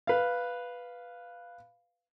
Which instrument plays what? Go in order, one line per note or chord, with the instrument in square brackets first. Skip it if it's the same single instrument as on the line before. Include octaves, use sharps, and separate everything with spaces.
[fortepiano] B4 F5